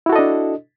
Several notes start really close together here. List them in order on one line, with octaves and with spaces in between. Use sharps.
E4 F#4 A4 D#5 D4